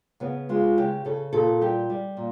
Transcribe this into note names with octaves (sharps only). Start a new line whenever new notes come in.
C#3 B3
G#3 F4
C#3 G4
C#3 A4
A#2 A4
G3 G4
G3
A#2